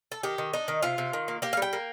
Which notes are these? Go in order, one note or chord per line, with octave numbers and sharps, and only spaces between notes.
A4
D#3 G4
D#3
D4 D#4
D#3
C3 F4
C3
D#3
A#3
A#3 G4
F5
G3
G5
A#3